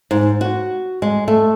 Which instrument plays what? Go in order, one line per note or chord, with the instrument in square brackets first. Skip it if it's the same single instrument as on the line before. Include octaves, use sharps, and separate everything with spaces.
[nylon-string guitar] G#2
F#4
G#3
A3